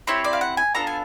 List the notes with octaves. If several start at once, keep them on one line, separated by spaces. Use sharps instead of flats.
C4 E4 G4 C#5
D5
F5
F#5
G#5
B3 D4 F4 A4 A#5
G#5